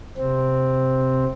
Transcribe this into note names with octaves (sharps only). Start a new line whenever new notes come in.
C3 C4